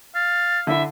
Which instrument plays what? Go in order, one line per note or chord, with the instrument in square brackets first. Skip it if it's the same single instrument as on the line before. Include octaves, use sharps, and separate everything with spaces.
[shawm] F5 [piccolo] A6
[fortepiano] D3 E4 [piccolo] E5